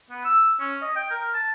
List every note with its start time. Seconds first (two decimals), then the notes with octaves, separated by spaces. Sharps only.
0.10 B3
0.25 E6
0.60 C#4
0.82 D#5
0.96 G5
1.11 A#4
1.34 A5